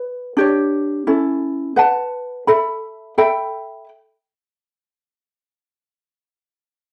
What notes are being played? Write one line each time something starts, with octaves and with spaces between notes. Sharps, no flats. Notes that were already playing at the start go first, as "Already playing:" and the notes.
Already playing: B4
D4 G4 C#5
C#4 E4 A4
B4 F#5 A5
A4 E5 B5
A4 E5 G5 B5